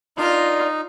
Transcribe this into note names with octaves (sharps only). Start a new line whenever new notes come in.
D4 D#4 F4 A#4